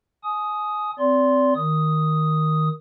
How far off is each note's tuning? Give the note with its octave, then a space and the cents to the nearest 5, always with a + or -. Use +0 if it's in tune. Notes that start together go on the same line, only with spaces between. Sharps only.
G#5 +30 D#6 +0
C4 -15 D5 -30 C6 +0
D#3 +0 D#6 +0